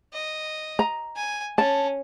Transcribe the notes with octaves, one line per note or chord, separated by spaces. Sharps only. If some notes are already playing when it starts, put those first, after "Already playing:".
D#5
A#5
G#5
C#4 A5